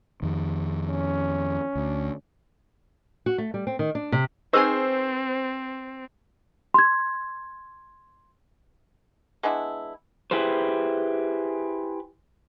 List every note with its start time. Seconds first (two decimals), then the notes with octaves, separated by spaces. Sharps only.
0.22 F2 D#3
0.89 C#4
1.75 D2
3.26 F#4
3.38 A3
3.54 G3
3.67 C4
3.79 D#3
3.95 D4
4.12 C3
4.53 C4 D#4 G#4 B4 C5 G#5 C#6 E6
6.74 C6 G#6
9.43 G#3 B3 D4 E4
10.31 E4 G4 G#4 B4 C5